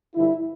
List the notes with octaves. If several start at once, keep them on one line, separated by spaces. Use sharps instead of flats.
G2 D3 F3 E4